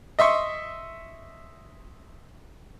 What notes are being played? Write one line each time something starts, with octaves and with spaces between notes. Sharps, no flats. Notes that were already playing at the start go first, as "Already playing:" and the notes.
D#5 E5 C6 C#6